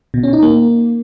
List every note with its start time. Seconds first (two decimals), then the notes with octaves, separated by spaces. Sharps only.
0.14 B2
0.23 C#4
0.33 D#4
0.42 A#3